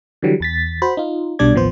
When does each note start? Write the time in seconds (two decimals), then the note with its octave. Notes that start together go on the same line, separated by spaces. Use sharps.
0.22 D3 E3 F#3 G3
0.40 E2 A6 B6
0.82 F#4 C5 B5
0.97 D#4 F4
1.39 B1 B2 G3 D4 D5 G#6
1.54 A1 D#2 F3 B3 C5